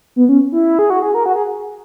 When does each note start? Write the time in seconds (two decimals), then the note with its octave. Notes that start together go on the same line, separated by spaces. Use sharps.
0.16 B3
0.29 C#4
0.52 E4
0.79 G#4
0.90 F#4
1.02 G#4
1.15 A#4
1.26 F#4
1.36 G#4